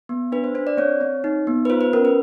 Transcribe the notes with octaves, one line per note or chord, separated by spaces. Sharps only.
B3
D4 B4
C5
D4 C5
D5
C4 C#5
C4
D#4
B3
B4
F4 C5
B4
C#4 A#4
B4